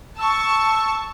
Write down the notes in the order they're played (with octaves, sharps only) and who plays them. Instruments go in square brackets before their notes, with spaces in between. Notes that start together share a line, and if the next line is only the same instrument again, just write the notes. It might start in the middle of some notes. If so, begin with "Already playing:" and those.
[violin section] A5 C#6 [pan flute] E6